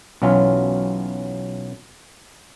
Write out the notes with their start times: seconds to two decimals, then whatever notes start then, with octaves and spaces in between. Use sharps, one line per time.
0.22 B1 E3 F#3 C#4 F4